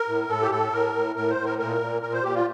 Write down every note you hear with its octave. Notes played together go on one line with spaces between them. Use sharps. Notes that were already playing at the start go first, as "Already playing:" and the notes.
Already playing: A#4
A2
A2 A4
G4
A2 A4
A2 A#4
A2
A2 A#4
C5
A2
A#4
A#2 A#4
A#2
A#2 A#4
C5
A#2 G4
F4